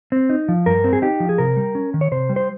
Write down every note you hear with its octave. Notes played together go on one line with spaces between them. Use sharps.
C4
D#4
F3
G2 A#4
C4
G#4
D#4 G4
F3
G#4
C3 A#4
G3
C#4
D#3
C#5
C3 C5
G3
C5